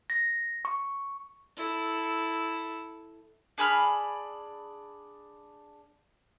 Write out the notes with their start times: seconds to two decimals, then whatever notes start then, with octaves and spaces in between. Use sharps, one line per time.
0.10 A#6
0.65 C#6
1.56 E4 A4
3.58 D4 G#4 B5 F6